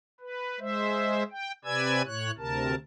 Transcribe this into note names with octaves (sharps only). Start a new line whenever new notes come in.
B4
G#3 C5 E5
G5
C3 B4 D5 G#5 E6 G#6
A2 C#5 F#6
D2 C3 A#4 A5